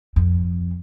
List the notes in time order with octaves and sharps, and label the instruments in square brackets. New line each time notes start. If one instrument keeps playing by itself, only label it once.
[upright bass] F2